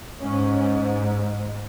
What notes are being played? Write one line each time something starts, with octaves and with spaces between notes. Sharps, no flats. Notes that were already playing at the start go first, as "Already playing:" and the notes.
G#2 C#4